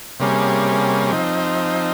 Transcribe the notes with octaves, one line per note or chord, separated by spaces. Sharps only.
C3 G3 A#3 C#4 G#4
F3 C4 D#4